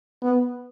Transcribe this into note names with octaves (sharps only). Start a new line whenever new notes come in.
B3